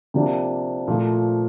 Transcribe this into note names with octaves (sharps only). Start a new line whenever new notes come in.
C3 F3 A#3 D4 G4
A#2 F3 A3